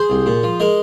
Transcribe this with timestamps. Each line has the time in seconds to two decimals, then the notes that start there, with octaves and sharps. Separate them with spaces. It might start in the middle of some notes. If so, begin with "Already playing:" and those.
Already playing: G#4 C5
0.10 C2
0.26 A#2
0.43 F3
0.60 G#3 A#4 D#5